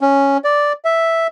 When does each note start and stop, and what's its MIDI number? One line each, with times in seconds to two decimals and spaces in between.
0.01 0.37 61
0.44 0.73 74
0.85 1.27 76